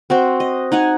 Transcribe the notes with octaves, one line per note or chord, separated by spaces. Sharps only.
C4 F#4 C5
D#5
D#4 F#5 G#5